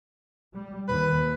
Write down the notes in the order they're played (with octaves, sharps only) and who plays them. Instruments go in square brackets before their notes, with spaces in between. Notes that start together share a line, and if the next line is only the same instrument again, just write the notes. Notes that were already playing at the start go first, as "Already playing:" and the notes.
[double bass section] G3
[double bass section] D#2 [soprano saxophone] B4